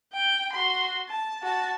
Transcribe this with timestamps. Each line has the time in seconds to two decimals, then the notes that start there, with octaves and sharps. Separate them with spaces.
0.13 G5
0.53 F#4 C6
1.09 A5
1.43 F#4 A5